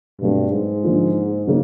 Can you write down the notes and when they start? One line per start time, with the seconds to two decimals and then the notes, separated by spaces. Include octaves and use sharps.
0.21 G2 B2 F#3 A3 C4
0.52 G#2
0.84 D3 F3 A#3 D4 F4
1.47 C#3 F#3 A#3 D#4